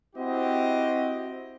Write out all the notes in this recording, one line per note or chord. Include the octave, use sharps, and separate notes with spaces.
C4 E4 F#4 G4 D#5